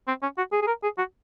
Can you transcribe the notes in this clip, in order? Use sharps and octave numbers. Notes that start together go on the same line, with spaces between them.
C4
C#4
F#4
G#4
G#4
A#4
G#4
F#4